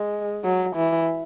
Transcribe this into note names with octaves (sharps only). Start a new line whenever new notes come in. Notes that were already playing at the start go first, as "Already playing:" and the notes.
Already playing: G#3
F#3
E3